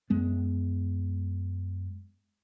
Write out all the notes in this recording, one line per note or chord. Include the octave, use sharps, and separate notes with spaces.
F#2 G#3 B3